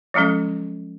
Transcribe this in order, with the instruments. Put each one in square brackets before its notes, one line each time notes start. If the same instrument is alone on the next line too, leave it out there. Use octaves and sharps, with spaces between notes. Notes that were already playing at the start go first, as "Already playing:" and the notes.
[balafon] F3 F#3 G#3 C#4 A4